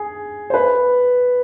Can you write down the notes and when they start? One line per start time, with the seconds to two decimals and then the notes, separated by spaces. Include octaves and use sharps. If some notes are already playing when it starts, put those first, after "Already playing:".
Already playing: G#4
0.50 C5
0.54 B4